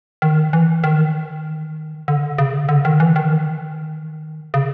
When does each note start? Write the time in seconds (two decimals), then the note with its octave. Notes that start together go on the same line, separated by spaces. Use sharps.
0.22 D#3
0.53 E3
0.84 D#3
2.08 D3
2.38 C#3
2.69 D3
2.85 D#3
3.00 E3
3.16 D#3
4.54 C#3